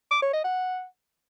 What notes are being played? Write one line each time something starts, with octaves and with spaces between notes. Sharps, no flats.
D6
C#5
D#5
F#5